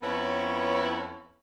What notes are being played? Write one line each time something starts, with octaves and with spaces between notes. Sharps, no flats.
F2 B3 C#4 E4 B4 C#5